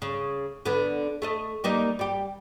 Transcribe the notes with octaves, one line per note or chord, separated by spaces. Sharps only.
C#3
D3 B3
A3 A4 D#5
G3 A#3 D#4
G3 G4